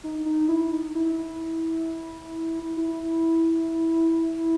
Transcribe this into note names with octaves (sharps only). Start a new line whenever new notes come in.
D#4
D#4
E4
D#4
E4
E4